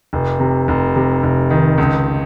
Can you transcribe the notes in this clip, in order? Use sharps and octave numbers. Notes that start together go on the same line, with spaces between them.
F1
C3
F1
C3
F1
D#3
C#2